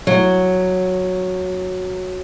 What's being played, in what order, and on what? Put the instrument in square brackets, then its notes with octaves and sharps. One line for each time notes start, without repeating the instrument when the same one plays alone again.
[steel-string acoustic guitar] F#3